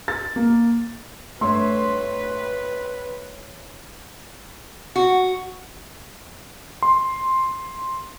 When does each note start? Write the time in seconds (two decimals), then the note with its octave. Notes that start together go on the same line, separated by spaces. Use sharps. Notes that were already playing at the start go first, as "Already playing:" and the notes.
0.08 A6
0.36 A#3
1.41 G2 A3 B4 C#5 E5 C6
4.96 F#4
6.82 C6